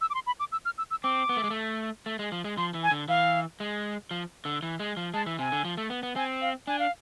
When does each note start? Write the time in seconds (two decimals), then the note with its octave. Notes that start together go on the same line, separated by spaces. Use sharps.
0.01 E6
0.10 D6
0.15 C6
0.27 B5
0.40 D6
0.52 E6
0.65 F6
0.78 E6
0.91 E6
1.04 C4 D6
1.29 B3
1.37 A3
1.44 G#3
1.50 A3
2.06 A3
2.19 G#3
2.32 F3
2.44 G#3
2.57 F3 C6
2.74 E3
2.83 G#5
2.91 D3
3.08 E3 F5
3.60 G#3
4.11 F3
4.45 D3
4.63 E3
4.80 G#3
4.97 F3
5.14 G#3 A5
5.26 E3
5.39 C3 G#5
5.52 D3
5.65 F3
5.77 A3
5.90 B3
6.03 B3
6.16 C4 G#5
6.41 F5
6.67 D4 G#5
6.79 F5